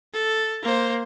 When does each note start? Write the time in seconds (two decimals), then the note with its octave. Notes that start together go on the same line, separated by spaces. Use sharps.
0.14 A4
0.63 A#3 C5